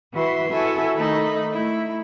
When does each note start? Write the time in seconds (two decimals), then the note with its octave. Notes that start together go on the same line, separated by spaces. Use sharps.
0.13 E3 F#4 B4 E5 C6
0.48 E4 F#4 A4 E5 G#5
0.94 D#3 A3 D#4 B5
1.51 A3 E4